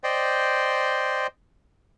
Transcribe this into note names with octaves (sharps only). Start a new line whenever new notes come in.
C5 D5 D#5 G5 C6